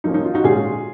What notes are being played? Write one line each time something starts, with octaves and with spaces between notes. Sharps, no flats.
F3 A#3 C#4 D#4
D#4
F4
D#4 F#4
A#2 G#3 C#4 F4 G#4